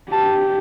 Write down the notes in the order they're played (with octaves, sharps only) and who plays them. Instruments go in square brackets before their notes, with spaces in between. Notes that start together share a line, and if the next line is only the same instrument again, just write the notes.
[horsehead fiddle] G4 [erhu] A5